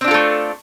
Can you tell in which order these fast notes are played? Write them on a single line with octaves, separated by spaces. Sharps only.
C4 D4 F4 A4 A3